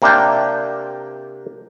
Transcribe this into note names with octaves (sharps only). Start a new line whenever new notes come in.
C3 A#3 D4 G4 G5 A5